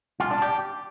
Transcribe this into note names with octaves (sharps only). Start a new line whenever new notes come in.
F4
D4
G4